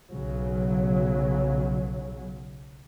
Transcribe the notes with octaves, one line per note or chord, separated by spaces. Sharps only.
B1 C#3 F#3